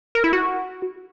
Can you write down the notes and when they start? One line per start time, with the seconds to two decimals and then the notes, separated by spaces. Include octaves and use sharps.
0.15 A#4
0.24 E4
0.33 F#4